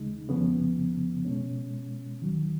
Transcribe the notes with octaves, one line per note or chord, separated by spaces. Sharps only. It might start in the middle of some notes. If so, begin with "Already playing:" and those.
Already playing: D#2 C#3 G#3 D#4
F2 C#3 F3 B3
B2 G#3 C#4
D#2 D#3 F#3